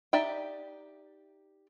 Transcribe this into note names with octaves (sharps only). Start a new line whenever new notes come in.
D#4 G4 D5 E5 G5